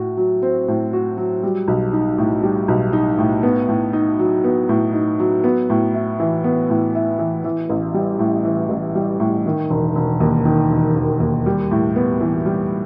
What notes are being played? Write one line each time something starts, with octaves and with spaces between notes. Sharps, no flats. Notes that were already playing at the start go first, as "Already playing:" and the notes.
Already playing: A2 F#4
F#3
C4
A2
F#4
F#3
G3
B1
D#4
A2
G3
B1
D#4
A2
B3
A2
D#4
F#3
B3
A2
D#4
F#3
B3
A2
E4
E3
B3
A2
E4
E3
E3
A1
G3
A2
E3
A1
G3
A2
D#3
E1
E1
D#2
D#3
E1
E1
D#2
G3
A2
B3
E3
G3